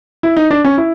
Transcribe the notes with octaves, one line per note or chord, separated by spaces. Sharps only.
E4
D#4
D4
C#4
E4